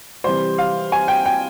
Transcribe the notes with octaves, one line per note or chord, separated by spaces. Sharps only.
C3 E3 G3 C5
F5
G#5
G5
G5